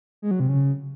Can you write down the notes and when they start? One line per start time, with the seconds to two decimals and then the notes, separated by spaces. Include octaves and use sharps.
0.22 G#3
0.31 F#3
0.40 C3
0.49 C#3